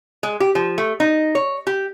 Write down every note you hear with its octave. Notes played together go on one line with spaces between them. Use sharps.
G#3
G4
F3
A3
D#4
C#5
G4